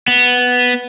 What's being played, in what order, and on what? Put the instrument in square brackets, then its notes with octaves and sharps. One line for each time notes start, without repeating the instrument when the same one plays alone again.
[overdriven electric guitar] B3